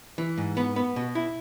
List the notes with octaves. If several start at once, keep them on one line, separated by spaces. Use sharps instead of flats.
E3
G#2
B3
B3
B2
E4